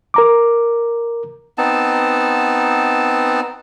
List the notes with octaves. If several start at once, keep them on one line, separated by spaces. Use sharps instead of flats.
A#4 A#5 D6
B3 C4 D#4 A5